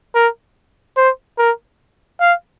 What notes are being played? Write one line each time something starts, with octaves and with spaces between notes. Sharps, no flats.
A#4
C5
A#4
F5